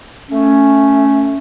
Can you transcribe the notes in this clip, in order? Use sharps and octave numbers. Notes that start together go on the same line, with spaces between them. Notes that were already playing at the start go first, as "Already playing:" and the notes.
A3 C#4